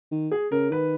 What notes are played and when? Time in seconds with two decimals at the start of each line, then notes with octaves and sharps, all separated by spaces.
0.11 D#3
0.31 G#4
0.52 C#3 A#4
0.71 D#3 B4